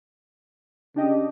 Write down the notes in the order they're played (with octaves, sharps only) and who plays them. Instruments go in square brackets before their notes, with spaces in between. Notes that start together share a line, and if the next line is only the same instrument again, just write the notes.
[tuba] C#3 [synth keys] D4 G4 D#5